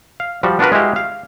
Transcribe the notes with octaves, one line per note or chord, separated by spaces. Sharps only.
F5
F3 G3 F#4
B3 D4 F4 F#4 A#4 B4
G#3 E4 F#4 G4 F5
F5